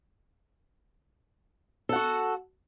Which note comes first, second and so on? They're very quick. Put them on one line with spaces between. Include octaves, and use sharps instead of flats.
A4 F#5 F#4